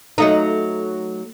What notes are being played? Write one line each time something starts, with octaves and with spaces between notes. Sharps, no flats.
F#3 A3 D#4